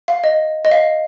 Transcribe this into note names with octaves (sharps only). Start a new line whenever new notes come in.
F5
D#5
D#5
F5